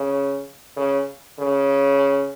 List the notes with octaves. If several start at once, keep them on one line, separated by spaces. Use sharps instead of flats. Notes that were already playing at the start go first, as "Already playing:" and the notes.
Already playing: C#3
C#3
C#3